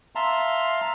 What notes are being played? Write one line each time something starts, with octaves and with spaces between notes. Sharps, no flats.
E5 F5 A5 A#5 C6